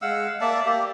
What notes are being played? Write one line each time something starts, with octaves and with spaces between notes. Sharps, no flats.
G#3 F5 F#5 E6
A#3 D5 E5 A5
A#3 G4